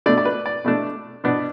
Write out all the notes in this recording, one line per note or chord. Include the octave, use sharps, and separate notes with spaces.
B2 A3 D4 D5
D5
B4
D5
B2 A3 D4
B2 B3 D4